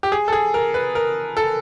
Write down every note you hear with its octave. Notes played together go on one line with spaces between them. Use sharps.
G4
G#4
A4
G#4
A#4
B4
A#4
A4